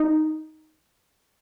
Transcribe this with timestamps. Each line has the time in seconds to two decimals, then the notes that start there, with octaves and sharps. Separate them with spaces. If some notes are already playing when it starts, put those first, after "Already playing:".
Already playing: D#4